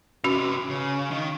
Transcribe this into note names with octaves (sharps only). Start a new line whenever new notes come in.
C3 C#4 F#4 B4
C#3
D#3